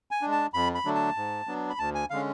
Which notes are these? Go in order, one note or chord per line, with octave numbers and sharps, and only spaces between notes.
G#5
G#3 D4
A5
F2 B5
B5
D3 F#3 A3 D4
A5
G#2
F#3 B3 D4
B5
D2 A5
G#5
D3 G#3 C#4 F5